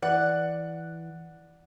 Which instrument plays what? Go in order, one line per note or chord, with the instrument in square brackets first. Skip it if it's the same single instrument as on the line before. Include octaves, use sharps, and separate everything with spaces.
[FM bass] E3 [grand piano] D5 [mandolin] F#5 F#6